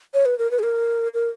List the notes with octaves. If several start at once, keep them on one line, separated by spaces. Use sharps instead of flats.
C#5
B4
A#4
B4
G#4
A#4
A#4